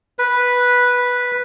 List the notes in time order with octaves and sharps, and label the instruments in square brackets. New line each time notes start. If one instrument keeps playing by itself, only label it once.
[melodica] B4